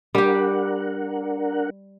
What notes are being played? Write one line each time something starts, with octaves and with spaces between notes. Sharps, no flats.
G3 D4 G4 A#4 F#5